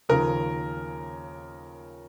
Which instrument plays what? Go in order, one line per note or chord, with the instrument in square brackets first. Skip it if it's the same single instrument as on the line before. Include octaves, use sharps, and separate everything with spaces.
[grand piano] D#2 C#3 F3 A#4